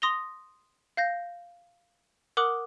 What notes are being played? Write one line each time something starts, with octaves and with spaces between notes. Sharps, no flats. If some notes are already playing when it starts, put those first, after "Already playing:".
C6 D#6 A#6 F7 G7
F5 G6 A#6
A#4 F#5 D6 D#6 F#6 F#7